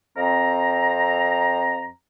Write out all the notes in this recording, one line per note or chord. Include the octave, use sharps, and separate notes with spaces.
F2 C4 A#5